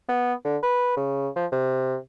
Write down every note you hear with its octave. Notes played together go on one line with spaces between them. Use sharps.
B3
D3
B4
C#3
F3
C3